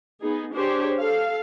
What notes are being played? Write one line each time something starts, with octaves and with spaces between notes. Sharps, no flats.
B3 D#4 G#4
D4 G4 G#4 C5 C#5
A4 F5